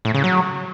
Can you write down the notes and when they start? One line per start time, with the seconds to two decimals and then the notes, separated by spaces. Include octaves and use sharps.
0.05 A2
0.14 C#3
0.24 F#3